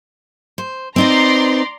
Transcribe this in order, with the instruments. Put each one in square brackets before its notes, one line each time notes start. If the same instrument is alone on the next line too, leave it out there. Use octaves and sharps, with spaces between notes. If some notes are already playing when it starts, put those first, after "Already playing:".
[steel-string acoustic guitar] C5
[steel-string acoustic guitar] C4 D#4 B4 [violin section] D5 A#5 C6